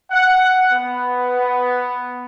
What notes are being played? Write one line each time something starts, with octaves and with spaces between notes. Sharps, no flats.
F#5
B3